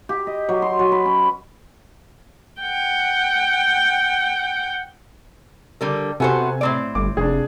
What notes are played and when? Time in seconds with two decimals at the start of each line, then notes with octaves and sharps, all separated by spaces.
0.09 G4
0.27 D#5
0.49 F#3
0.62 C6
0.79 F#3
0.92 B4
1.06 C#4
2.62 F#5 G5
5.81 D3 G3 A#4
6.20 C3 B3 F#4 A4 C5 G#5
6.61 A2 C4 D5
6.95 G1 D6
7.17 F1 D4 G#4